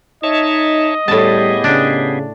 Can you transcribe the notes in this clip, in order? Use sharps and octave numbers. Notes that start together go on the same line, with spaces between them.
D#4 C#5 D#5 E5 A5
A2 G3 B3 G4 G#4 A5
C#3 D4